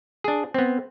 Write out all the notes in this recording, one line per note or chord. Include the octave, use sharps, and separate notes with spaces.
D4 G#4
B3 C4